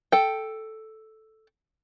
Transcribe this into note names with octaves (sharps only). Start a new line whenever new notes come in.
A4 G5